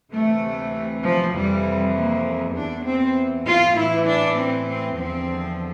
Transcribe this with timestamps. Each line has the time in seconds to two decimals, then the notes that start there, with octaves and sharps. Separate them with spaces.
0.12 D2 C3 E3 A3
1.03 F3
1.33 F2 C3 E3 G3
1.95 A#3
2.55 E2 E3 D4
2.85 C4
3.45 F4
3.76 A2 E3 E4
4.06 D4
4.37 C4
4.67 C4
4.98 E2 D3 F3 C4